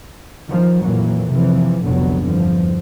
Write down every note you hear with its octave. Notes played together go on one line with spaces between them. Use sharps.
D#3 F3
F2 A#2 E3 F#3 A#3
C3 E3 F3
F1 C2 D3 F#3 B3
E2 G2 D3 F3